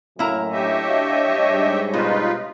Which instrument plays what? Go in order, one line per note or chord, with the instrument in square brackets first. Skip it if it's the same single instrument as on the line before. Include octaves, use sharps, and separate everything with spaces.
[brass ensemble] F#2 A2 F#3 [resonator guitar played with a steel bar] A#3 E4 A#5
[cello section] D4 C#5 D#5 [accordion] G4 E5
[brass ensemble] F#4 F5
G#2 G3
[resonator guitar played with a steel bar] B2 [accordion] D#4 F4 B4